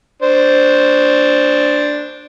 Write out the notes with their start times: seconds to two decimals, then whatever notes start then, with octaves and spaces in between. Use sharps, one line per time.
0.22 D4 C5